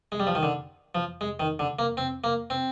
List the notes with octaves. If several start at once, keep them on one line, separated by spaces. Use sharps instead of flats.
G#3
G3
F3
D#3
D3
F3
G#3
D#3
D3
A#3
C4
A#3
C4